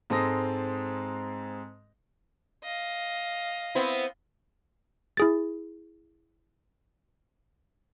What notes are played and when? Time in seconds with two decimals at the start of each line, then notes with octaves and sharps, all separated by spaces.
0.10 G#2 G#3 C4 A4 D#6 A#6
2.64 D#5 F5
3.75 B3 C4 E4
5.17 E4 G#4 A6